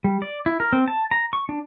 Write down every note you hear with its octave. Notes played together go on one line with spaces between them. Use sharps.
G3
D5
E4
A#4
C4
A5
A#5
C#6
D4